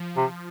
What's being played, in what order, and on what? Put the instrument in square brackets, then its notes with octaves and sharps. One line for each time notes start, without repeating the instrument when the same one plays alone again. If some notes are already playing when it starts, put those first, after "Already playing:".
Already playing: [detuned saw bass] F3
[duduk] C3